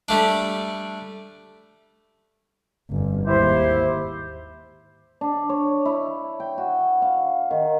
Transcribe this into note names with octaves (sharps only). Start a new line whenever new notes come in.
G3 A3 D4
G1 F2
D#2 G#2 E4 G4 C5
D4
C#5
E4
G5
F#4
F5
D#3